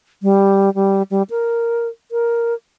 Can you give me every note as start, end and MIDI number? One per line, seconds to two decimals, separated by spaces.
0.23 0.73 55
0.75 1.03 55
1.11 1.23 55
1.30 1.88 70
2.12 2.54 70